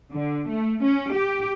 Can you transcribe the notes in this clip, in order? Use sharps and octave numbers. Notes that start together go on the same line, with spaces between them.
D3
A3
C#4
G4